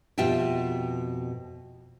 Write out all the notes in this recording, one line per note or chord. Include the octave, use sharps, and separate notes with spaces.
F2 B2 F4 G4 E5 G5